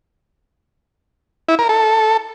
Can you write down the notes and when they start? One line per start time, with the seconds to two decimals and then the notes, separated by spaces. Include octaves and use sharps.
1.49 E4
1.59 A#4
1.69 A4